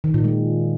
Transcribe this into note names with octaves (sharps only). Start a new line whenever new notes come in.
D#3
A#2
G#3